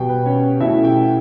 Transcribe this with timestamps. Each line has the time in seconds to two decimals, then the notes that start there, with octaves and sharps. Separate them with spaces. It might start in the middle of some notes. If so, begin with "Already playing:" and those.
Already playing: B2 G3 B3 G4 G5
0.09 B4
0.26 C#4 C#5
0.60 B2 A3 C#4 E4 E5
0.83 G4 G5